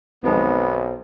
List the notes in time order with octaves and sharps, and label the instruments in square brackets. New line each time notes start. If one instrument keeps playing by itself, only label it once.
[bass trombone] B1 [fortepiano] F2 D#3 G#3 [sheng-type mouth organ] B3 [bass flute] C5